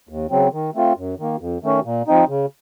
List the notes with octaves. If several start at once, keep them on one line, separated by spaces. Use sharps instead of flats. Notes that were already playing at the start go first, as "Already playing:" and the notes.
D#2
C#3 F#3 C4
D#3
A3 C4 F4
F#2
D#3 A#3
F2
D#3 A3 C#4
A#2
F3 C4 D#4
C#3